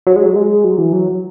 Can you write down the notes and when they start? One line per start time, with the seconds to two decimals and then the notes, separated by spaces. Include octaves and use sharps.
0.07 F#3
0.16 G#3
0.26 F#3
0.36 G#3
0.64 F#3
0.78 E3
0.93 F#3